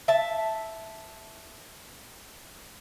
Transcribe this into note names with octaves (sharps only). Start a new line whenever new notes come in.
E5 A5